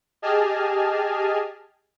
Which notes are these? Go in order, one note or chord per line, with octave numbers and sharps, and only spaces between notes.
G4 G#4 D#5 G#5 A5 F6